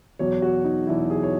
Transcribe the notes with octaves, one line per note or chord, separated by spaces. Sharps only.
E2 B2 F#3 C#5
F#4
D#4
E2 B2 F#3 E4
G#4
C#5